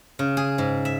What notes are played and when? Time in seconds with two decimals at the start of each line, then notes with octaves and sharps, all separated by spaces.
0.19 C#3
0.37 G#4
0.58 G#2
0.85 E5